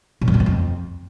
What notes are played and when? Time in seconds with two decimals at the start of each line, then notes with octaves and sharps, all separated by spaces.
0.21 A#2
0.28 F2
0.34 D3
0.40 E2
0.46 F2